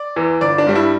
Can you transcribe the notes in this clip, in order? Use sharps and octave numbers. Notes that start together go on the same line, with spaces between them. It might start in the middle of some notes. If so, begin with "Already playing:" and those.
Already playing: D5
E2 E3
G1 D5
D4
G2 G3
E4